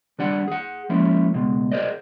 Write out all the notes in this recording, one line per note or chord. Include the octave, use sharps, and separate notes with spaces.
D#3 G3 D4 D5 F#5
G#4 F#5
F3 G#3 A#3 C#4 E4
C#2 B2 G#3
G#4 A#4 C5 D5 D#5